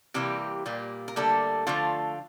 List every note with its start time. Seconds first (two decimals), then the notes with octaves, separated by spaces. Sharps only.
0.14 C3 E3 G3 A#3 G4
0.66 A#2 G3 A#3
1.08 A#4
1.16 D3 G3 A3 A#3 A4
1.67 D3 F3 A3 F4